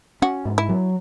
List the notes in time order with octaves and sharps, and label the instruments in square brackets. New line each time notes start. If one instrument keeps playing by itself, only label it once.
[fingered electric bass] C#4 [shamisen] F#4
[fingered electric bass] G#2
[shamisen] E4
[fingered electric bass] F#3